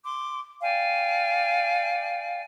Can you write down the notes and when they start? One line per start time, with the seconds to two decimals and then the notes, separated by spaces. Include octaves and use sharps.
0.03 C6 D6
0.60 D5 F5 G5 G#5